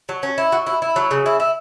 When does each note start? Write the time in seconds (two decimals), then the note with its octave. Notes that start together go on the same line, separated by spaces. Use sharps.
0.09 F#3
0.23 C#4
0.38 E4
0.52 F#3
0.67 E4
0.82 E4
0.96 F#3
1.11 C#3
1.26 E4
1.40 E4